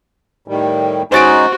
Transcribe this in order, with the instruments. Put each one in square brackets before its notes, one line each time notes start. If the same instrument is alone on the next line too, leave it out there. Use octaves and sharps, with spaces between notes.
[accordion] A2 D#3 G3
[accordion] G#3 C#4 D#4 [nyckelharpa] F#4 [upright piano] C5 A6 D7